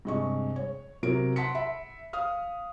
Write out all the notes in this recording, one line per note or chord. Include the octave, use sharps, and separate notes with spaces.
G2 C3 G#3 D#5 C#6
C#5
C3 F#3 A#4 D7
F#5 A5 C6 B6 C#7
E5 B5
F5 D#6 F6